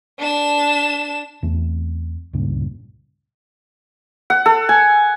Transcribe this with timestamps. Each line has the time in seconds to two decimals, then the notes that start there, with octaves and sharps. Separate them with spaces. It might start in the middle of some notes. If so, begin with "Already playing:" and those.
0.19 D4 E7
1.43 E2 A3 C4
2.33 D1 C#2 G2 A#2
4.30 F#5
4.46 A4
4.69 G#5